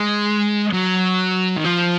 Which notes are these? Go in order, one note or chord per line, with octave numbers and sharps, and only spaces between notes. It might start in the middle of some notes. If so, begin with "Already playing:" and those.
Already playing: G#3
F#3
D#3
F3